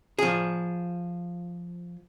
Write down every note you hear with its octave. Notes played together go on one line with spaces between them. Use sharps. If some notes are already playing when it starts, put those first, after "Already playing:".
F3 G#4